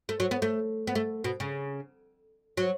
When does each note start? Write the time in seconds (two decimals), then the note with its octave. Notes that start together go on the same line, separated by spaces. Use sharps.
0.09 A3
0.20 F#3
0.31 B3
0.42 A3
0.87 B3
0.95 A3
1.24 B2
1.40 C#3
2.57 F#3